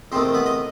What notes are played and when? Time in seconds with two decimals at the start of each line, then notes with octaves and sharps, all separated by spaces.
0.12 E2 C3 D#3 A3 C4 C5
0.34 B3 B4
0.46 D#5